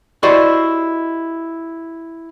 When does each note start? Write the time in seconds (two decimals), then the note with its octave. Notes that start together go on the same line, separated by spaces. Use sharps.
0.23 E4 F#4 G4 C5 D5 D#5